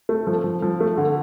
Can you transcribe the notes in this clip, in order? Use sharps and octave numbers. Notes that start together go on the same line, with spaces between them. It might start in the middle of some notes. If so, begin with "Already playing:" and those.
A3
F3
F3
F3
A3
D3